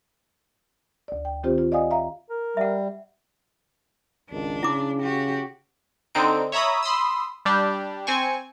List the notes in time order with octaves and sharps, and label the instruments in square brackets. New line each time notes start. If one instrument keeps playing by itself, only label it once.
[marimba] D2 D5
G5
D#3 C4 F4 G4 C5
F4
D5 D#5 F5 F#5 G#5 D#6
E5 F5 A#5
[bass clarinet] A#4
[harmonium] G3 [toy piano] E5 F#5
[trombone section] G#1 C#2 D#3 [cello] D4
[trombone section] C#3 [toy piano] E4 D6
[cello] F#4 G4
[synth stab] D3 C4 D#4 D7
C#5 E5 A#5 B5 D#6
B5 C6 D#6 E6
G3 D4 G4
C4 G#5 C#6